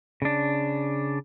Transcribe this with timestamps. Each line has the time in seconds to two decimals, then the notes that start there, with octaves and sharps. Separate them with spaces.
0.22 C#3 D4